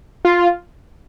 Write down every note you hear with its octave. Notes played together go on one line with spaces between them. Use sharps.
F4